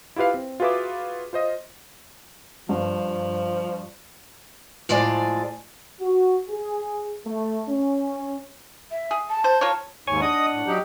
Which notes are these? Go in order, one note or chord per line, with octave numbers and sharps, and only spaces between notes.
E4 F4 G4 B4 F5
C4
F4 F#4 G#4 B4 E5 D6
F4 C5 D#5
G2 F3
A2 F3 G#3 D5 G#5
F#4
G#4
A3
C#4
E5
G#4
A5
C5
F4 A#4 C#5
D#2 G#2 C#5 G#5 C#6
D4 D#5 F#5 D#6
A2
F#3 D#4 G4